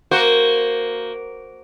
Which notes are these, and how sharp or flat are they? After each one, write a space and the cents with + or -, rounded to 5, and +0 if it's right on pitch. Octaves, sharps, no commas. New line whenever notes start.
A#3 +0 F#4 +0 C5 +0